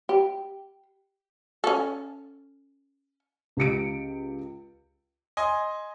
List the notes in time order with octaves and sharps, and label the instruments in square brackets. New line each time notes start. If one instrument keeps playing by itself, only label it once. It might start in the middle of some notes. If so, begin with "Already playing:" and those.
[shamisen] G4
C#4 A4
[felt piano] C#2 G4 C#7 D7
[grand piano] D#5 G#5 C6